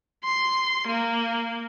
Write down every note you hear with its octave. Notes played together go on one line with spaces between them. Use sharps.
C6
A#3